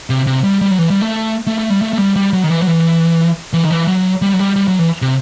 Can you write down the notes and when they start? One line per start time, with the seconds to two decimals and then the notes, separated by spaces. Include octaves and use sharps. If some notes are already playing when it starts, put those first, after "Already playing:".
0.10 C3
0.27 C3
0.44 G3
0.61 G3
0.71 F#3
0.78 E3
0.90 G3
1.01 A3
1.47 A3
1.59 A3
1.70 G3
1.82 A3
1.93 A3
1.99 G3
2.16 G3
2.33 F#3
2.44 D#3
2.50 E3
2.62 F#3
2.67 E3
3.53 E3
3.65 D#3
3.71 E3
3.87 F#3
4.22 G3
4.33 F#3
4.39 G3
4.56 G3
4.68 F#3
4.79 E3
5.02 C3